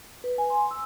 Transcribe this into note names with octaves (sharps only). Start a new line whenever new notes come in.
B4
G#5
C6
E6